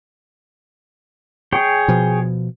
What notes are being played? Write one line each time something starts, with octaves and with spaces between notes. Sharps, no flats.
G#4 C#5 G5
B2 F3